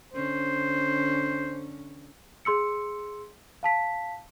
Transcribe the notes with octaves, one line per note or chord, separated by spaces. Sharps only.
D3 C#4 C5
G#4 C6 E6 C#7
F5 A5 B6